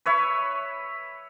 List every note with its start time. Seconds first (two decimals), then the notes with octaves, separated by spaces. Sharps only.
0.06 B4 C#5 E5 B5